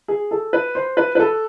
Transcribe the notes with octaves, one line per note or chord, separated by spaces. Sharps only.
G#4
A4
B4
C5
B4
B4
A4